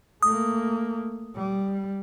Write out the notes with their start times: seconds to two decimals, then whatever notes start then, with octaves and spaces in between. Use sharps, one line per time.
0.23 A3 A#3 D#6
1.35 G3